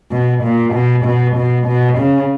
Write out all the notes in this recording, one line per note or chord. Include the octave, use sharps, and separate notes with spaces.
B2
A#2
B2
B2
B2
B2
C#3